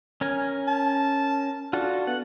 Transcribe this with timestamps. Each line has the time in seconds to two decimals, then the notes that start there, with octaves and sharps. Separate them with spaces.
0.21 C#4 A#4 G#5
0.68 A5
1.73 D4 F4 F#4 A4
2.07 B3 F#5